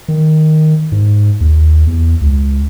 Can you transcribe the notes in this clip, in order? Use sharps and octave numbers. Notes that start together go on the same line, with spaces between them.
D#3
G#2
D#2
E2
C#2